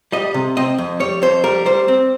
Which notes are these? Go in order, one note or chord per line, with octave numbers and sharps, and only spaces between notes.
G3 D#5
C3
C4 D#5
F2
G3 C#5
F2 C5
G3 A#4
G3 C5
C4